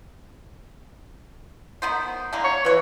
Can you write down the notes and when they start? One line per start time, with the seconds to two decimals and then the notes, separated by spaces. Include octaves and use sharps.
1.82 D#3 B3 C5
2.33 D3 E3 A#3
2.44 C#5
2.65 E3 F#4 C#5